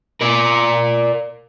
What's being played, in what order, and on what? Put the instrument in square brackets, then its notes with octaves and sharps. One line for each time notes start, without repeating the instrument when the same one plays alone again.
[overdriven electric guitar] A#4 D5